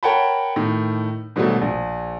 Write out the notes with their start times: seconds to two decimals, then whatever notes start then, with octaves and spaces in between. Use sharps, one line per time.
0.03 A#4 C#5 F#5 G5 A5 B5
0.56 A2 D#3
1.36 G#2 B2 D#3 F#3 G3 A3
1.62 A#1